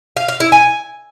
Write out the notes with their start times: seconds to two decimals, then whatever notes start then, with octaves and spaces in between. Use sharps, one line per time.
0.17 F5
0.28 F5
0.40 E4
0.52 G#5